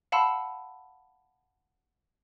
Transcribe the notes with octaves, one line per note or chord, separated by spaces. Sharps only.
F5 F#5 A5 B5 C6 E6